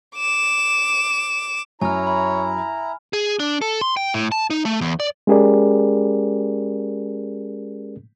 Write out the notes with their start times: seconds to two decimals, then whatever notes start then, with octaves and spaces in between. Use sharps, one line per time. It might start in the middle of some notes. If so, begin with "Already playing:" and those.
0.17 D6 E7
1.81 F#2 E4 C#5 G#5 A#5 F6
2.07 B5
3.13 G#4
3.39 D4
3.62 A4
3.81 C6
3.97 G5
4.14 A2
4.32 A5
4.50 D#4
4.65 A3
4.81 E2
5.00 D5
5.27 G#3 C#4 G4 G#4 A#4 D5